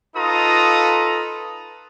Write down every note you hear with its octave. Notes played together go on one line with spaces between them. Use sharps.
D#4 F4 A4 B4 A#5 D#6